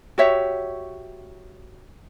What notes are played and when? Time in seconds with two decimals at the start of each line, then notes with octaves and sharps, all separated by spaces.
0.18 F#4 G4 C#5 E5